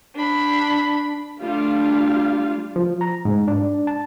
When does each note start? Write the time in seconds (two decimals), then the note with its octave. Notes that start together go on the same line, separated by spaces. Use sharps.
0.15 D4 B5
1.40 G3 A3 D4 F4 F5
2.76 F3
3.01 A#5
3.25 G#2
3.48 D4
3.87 A5